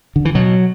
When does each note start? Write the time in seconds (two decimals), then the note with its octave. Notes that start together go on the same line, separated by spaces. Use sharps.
0.16 D3
0.25 E3
0.35 B2 F#3